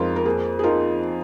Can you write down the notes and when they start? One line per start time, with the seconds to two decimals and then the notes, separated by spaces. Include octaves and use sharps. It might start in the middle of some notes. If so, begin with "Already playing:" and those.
Already playing: F2 G#3 D#4 F4 A#4
0.16 A#4
0.25 A#3 G#4
0.59 G#4
0.63 D#4 F4 A#4